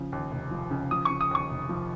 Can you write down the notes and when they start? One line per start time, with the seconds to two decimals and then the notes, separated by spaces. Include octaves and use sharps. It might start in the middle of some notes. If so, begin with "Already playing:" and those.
Already playing: C#3 F3
0.12 D#2
0.32 F1
0.51 F3
0.71 C#3
0.91 F3 D#6
1.05 C#3 C#6
1.21 D#6
1.31 D#2 C#6
1.50 F1
1.69 F3